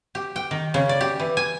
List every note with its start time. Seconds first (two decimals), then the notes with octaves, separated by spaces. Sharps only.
0.15 G4
0.36 G5
0.51 D#3
0.74 C#3
0.89 D5
1.01 G4
1.20 E3
1.37 G#5